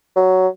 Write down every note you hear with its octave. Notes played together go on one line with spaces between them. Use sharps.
F#3